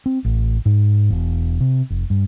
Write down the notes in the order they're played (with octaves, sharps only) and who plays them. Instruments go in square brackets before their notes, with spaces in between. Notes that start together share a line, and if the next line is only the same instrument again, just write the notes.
[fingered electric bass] C4
A1
G#2
E1
C3
F1
G2